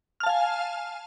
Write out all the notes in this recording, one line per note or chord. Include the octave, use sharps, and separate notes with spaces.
F5 G#5 A5 F6